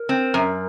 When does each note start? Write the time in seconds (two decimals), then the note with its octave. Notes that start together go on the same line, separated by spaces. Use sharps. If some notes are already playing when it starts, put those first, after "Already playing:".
Already playing: A#4
0.09 C4
0.34 F#2